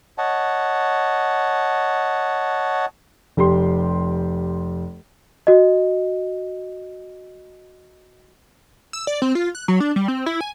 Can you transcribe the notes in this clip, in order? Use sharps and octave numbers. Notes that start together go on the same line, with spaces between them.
C#5 D#5 F#5 A5
F1 G4 C6
F#4 D#5
E6
D5
C4
F4
F#6
F#3
D4
G3
C4
E4
G#5